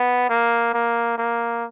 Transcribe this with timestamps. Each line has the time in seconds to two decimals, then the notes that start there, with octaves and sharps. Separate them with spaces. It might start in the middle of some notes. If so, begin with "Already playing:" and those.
Already playing: B3
0.29 A#3
0.74 A#3
1.18 A#3